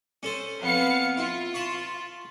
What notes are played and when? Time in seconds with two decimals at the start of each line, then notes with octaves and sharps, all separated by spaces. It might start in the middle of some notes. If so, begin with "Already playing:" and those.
0.23 C#4 A4 C5
0.62 F2 B3 F5 C#7
1.17 E4 F4
1.54 A5 B5 C#6